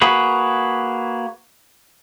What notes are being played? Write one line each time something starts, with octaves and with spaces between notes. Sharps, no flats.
A#3 F#4 G#4 B4